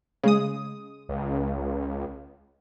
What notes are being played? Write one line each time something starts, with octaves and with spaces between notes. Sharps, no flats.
C#3 G#3 D#6
C#2